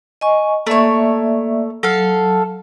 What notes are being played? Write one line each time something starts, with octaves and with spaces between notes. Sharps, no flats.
D#5 G#5 C#6
A3 A#3 C#5 D5 E5
F#3 A4 F5